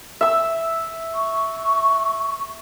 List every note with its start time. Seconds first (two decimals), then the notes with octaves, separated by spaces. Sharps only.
0.21 E5 E6
1.15 C#6